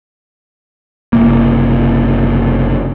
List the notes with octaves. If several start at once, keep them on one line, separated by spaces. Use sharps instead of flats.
F#1 C3 A#3